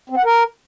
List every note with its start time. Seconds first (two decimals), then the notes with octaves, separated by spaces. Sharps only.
0.10 C4
0.17 F#5
0.25 A#4